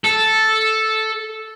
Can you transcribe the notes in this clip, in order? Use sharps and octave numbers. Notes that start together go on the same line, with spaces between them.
A4